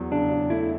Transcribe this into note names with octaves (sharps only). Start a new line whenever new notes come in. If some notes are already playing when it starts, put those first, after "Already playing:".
Already playing: E2 F#3
C#3 D4
C#3
A3 E4